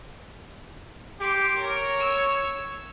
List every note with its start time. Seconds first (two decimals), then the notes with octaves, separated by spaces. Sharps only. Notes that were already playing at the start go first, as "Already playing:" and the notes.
1.20 G4 C6 D6
1.58 A#4 C#5
2.00 E6